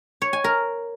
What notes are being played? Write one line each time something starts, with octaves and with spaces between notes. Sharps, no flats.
C#5
G#5
A#4